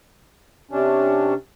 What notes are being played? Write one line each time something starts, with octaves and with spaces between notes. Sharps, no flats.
C3 C#4 D4